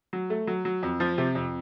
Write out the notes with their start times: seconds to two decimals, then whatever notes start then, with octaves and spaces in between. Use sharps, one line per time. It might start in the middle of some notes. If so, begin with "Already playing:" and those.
0.13 F#3
0.30 A3
0.47 F#3
0.65 F#3
0.83 F2
1.00 F3
1.18 C3
1.35 F2